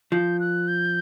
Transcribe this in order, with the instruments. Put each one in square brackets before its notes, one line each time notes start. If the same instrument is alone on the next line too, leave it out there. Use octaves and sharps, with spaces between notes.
[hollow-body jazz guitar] F3 [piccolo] G6
[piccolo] F#6
G6